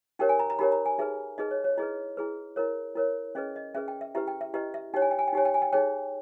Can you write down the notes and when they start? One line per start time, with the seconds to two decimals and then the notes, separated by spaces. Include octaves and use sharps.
0.19 D#4 G4 A#4 C#5 G5
0.29 G#5
0.39 A#5
0.50 A#5
0.59 D#4 G4 A#4 C#5 B5
0.72 A#5
0.86 G#5
0.98 D#4 G#4 B4 E5
1.38 D#4 G#4 B4 D#5
1.51 C#5
1.64 C#5
1.78 E4 G#4 B4 D#5
2.17 E4 G#4 B4
2.56 E4 A#4 C#5
2.96 E4 A#4 C#5
3.35 C#4 G#4 B4 D#5
3.56 D#5
3.75 C#4 G#4 B4 E5
3.88 G5
4.01 E5
4.15 E4 G4 B4 E5
4.28 G5
4.41 E5
4.54 E4 G4 B4 D#5
4.74 E5
4.94 D#4 G4 C#5 G5
5.02 G#5
5.11 G5
5.19 G#5
5.28 G5
5.33 D#4 G4 C#5 G#5
5.45 G5
5.54 G#5
5.62 G5
5.73 D#4 G#4 C#5 G5